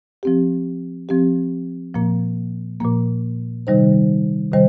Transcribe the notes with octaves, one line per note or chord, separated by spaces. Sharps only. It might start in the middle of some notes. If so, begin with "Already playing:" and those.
F3 C4 G4
F3 C4 G4
A#2 F3 A#3
A#2 F3 A#3
C3 D#3 G3 D#4 C5
C3 D#3 G3 C5